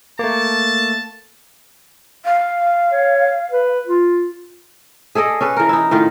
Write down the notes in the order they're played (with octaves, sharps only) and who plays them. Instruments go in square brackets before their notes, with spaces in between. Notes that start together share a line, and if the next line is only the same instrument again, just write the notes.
[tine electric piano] A3 A#3 [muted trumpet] A5
[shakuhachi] F5
[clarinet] C#5
B4
F4
[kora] G#4 A4 D5 D#5
C#4 A4 B4
E3 A#4
D#4 E4
A2 D#3 F4